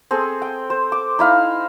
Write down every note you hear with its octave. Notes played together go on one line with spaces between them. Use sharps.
C4 G#4 A4
G5
C5
D6
D#4 E4 F5